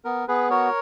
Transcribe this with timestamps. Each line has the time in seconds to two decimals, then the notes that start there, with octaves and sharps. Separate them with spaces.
0.05 B3 A#4
0.28 B3 G#4 B4
0.50 F#4 A#4 C#5